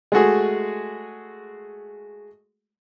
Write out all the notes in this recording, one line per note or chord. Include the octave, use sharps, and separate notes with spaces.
G#3 A3 F#4 G#4